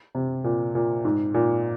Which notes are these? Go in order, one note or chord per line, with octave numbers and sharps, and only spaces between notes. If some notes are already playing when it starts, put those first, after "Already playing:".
C3
A#2
A#2
G#2
A#2